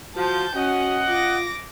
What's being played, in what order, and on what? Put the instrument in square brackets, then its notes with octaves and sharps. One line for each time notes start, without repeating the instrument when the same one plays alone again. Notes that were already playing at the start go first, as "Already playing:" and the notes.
[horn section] F3 [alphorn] F#4 [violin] A5 G6
[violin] C#4 [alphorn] F#4 [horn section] D#5 F#5
[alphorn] F4 [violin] D6 A#6